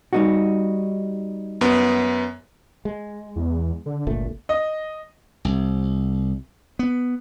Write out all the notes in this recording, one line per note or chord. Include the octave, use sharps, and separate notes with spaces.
G3 D#4 F#4
F#2 B3
G#3
E2
D3
G1 C#2 A#2 A3
D#5
C2
B3